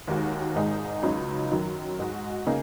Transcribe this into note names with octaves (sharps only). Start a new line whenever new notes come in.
D#2 D#3 G#3 F#4
G#1 G#2 G#3 D#4 G#4
C#2 C#3 F#3 D#4
F#2 D#3 F#3
G#2 G#3 F#4
C#3 A#3 D#4 G#4